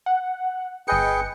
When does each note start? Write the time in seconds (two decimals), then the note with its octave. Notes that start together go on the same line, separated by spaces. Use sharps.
0.06 F#5
0.88 G1 G#4 B4 D#5 G5 C#7